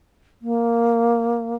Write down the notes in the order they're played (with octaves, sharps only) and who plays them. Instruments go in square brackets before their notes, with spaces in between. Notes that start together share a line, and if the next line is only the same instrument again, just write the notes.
[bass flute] A#3